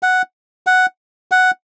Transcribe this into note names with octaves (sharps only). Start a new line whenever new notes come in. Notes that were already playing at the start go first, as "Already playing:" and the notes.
F#5
F#5
F#5